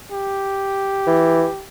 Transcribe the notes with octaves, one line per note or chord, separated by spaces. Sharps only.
G4
E3